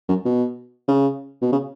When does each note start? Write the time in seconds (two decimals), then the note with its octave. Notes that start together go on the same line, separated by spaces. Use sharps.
0.09 F#2
0.25 B2
0.88 C#3
1.42 B2
1.52 C#3